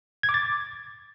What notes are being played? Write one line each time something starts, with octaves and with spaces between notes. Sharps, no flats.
G#6
D6
A6